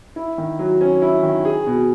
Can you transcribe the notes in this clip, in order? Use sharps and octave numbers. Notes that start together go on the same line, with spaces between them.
E4
D#3
F#3
C#4
E4
D#3
G#4
B2